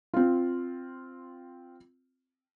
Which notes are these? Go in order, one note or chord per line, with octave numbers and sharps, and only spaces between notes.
C4 F4